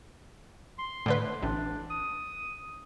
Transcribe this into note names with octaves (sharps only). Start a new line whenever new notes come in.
C6
A2 D3 B4
A1 D4
D#6